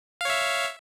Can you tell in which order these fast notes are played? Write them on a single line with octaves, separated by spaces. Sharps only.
F5 C#5 E5